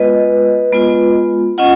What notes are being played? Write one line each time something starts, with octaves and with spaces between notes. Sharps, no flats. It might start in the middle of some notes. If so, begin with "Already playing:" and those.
Already playing: G#3 B3 F4 B4 D#5
G#3 B3 F4
C#4 F4 D#5 F#5